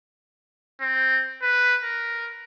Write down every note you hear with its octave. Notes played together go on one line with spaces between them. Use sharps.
C4
B4
A#4